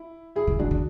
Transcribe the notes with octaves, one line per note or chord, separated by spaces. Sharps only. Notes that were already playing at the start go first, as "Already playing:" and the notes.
Already playing: E4
E4 G#4
C#3
C#3 D4 F#4
D3